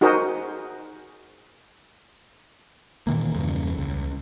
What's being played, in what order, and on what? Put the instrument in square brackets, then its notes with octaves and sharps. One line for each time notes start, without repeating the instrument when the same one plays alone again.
[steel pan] D#4 F#4 G#4 A#4 C5 D#5
[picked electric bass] A#2 D#3 E3 A#3
E2 G2 C#3
C#2